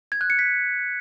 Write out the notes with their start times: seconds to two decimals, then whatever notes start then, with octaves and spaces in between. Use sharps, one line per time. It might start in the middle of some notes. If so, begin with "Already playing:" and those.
0.12 G#6
0.21 F#6
0.30 C#7
0.39 B6